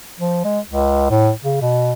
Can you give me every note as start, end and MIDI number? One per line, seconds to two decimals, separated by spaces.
0.20 0.43 53
0.44 0.59 56
0.70 1.08 37
1.10 1.31 45
1.44 1.57 49
1.61 1.93 47